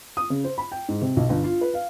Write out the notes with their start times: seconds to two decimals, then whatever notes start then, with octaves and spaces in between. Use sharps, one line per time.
0.17 D#6
0.30 C#3
0.44 C5
0.58 B5
0.72 G5
0.89 G#2
1.01 C3
1.16 B1
1.29 G1
1.44 F4
1.61 B4
1.74 F5